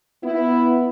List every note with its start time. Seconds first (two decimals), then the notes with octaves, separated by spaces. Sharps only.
0.23 B3 E4